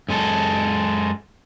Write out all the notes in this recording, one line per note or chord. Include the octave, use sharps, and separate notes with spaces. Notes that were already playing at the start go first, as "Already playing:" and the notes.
F#2 G#3 A4